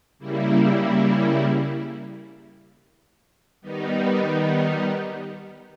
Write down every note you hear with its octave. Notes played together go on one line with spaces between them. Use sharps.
C#3 G3 A#3 E4
D#3 G3 B3 D#4